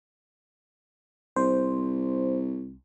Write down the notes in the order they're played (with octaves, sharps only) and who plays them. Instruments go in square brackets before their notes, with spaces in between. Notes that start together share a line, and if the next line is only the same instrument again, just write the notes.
[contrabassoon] C2 [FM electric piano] C5